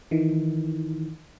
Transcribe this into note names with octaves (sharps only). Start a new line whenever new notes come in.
D#3 E3